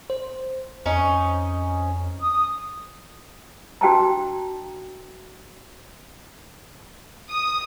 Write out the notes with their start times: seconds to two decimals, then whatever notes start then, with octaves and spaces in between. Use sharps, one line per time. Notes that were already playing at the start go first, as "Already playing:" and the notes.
0.10 C5
0.86 F2 C#4 D#4
2.20 D#6
3.81 D4 F#4 G5 A5 A#5
7.29 D#6